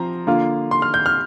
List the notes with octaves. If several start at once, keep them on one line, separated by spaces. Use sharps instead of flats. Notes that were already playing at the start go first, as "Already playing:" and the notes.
Already playing: F3 C4 A#5
D3 A#3 F4
C6
F6
G6
F6